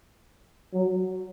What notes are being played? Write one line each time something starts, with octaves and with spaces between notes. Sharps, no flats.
F#3